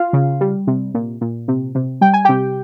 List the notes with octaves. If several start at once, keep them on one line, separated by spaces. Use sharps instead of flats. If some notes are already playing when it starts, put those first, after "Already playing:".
Already playing: F4 F5
C#3
G3
C3
A#2
A#2
C3
C3
G3 G5
G#5
C3 G4 G5